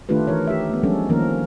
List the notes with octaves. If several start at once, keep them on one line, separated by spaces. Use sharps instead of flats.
D#3 A3 D4 F4 G4 B4
E3 D#4 A#4 C#5
G4 E5
A3 B3
F3 G3 G#3 C#4 D4 A4
D#3 F3 A#3 C#4 A#4